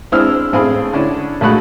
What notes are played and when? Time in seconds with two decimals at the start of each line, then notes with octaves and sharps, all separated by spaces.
0.12 G#3 C4 D4 E4 E6 F6
0.53 A1 C4 G#4 F5 B5
0.93 D3 C#4 D4 E4
1.41 A#1 G#3 A3 F#4 B5 F#6